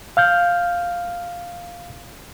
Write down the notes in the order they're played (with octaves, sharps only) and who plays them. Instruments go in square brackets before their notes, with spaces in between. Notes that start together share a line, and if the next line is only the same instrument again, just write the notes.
[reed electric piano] F5 F6 G6